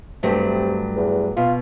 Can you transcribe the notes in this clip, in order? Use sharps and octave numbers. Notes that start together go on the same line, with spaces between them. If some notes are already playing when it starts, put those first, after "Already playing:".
G2 C3 F#3 A3
E2
B2 F4